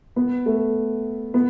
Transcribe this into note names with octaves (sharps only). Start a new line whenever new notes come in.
B3
A3
B3